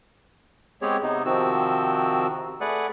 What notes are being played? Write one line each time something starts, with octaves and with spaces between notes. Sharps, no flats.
G#3 B3 C4 G4 G#4 C#5
C3 B3 D#4
C3 D#3 F3 C4 F#4 E6
A3 G#4 B4 D5 F#5